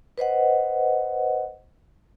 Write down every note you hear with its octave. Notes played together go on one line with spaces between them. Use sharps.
B4 C5 D#5 F#5